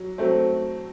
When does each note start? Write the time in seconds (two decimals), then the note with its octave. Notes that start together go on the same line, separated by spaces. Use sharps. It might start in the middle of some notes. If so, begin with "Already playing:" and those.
Already playing: F#3
0.18 F#3 A3 C4